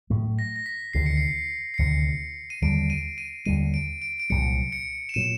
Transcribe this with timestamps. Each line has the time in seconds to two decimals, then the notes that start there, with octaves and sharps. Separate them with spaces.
0.10 A2 F#3 A3
0.39 A#6
0.56 A#6
0.66 B6
0.93 D2 C3 D#3 C7
1.06 C#7
1.17 C7
1.74 C7
1.78 D2 C3 D#3 C#7
2.50 D#7
2.62 D#2 D3 G3 D7
2.90 D#7
3.18 D#7
3.46 D#2 D3 G3 D#7
3.74 D7
4.02 D7
4.20 D7
4.30 C2 A#2 F#3 C#7
4.72 C#7
5.09 E7
5.14 A#2 F#3 D#7